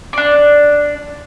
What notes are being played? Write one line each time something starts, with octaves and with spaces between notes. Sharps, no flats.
D4 D5